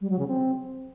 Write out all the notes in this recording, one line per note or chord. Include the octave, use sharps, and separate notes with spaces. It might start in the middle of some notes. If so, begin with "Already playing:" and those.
G3
F#3
C#3
C4